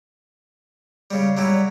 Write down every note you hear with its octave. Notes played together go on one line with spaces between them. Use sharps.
C#3 G3
F#3 G3 E4